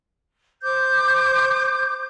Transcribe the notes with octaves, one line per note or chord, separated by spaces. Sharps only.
C5 D6 G6